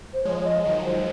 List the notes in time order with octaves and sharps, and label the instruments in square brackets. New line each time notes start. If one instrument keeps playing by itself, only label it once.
[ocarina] C5
[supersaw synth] F3 G#3 [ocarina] C#5
[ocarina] D#5
[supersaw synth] D#3 F#3
[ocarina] C5